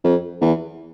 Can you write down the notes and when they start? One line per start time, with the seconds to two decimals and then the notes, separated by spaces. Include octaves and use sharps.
0.04 F2
0.41 E2